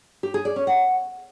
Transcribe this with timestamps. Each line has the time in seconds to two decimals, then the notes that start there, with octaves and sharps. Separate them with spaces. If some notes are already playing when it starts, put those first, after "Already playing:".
0.23 G4
0.34 G#4
0.45 D5
0.56 C#4
0.67 F#5